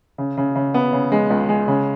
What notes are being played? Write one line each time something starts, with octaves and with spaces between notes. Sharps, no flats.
C#3
C#3
C#3
B3
C#3
G#3
C#2
G#3
C#3